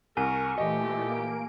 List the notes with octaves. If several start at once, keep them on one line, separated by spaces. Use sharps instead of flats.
C2 A#4 G#5 C#6
A#2 E3 A3 G4 D#5
A#3 D7